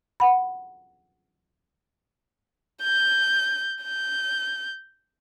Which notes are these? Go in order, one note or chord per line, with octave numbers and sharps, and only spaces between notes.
F#5 B5
G6
G6